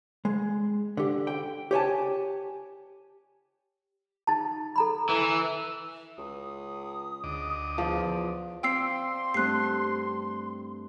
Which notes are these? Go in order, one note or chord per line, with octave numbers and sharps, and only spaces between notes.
G#3
D3 G4
G5
G4 C#5 G#5 A5
D#4 A5
A4 A#5 B5
E3
C#2 D#6
D2 D#5 D6
E2 F3
C4 F4 D5 G5 C6 E6 C7
G2 A3 C4 F#6 C7